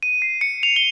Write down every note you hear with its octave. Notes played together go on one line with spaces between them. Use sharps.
D#7
C7
C#7
F7
G7